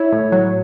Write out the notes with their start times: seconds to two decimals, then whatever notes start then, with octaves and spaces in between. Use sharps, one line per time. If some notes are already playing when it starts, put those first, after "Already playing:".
Already playing: E4 C#5
0.12 A2
0.32 F#3